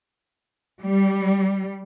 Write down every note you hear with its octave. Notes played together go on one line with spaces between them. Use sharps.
G3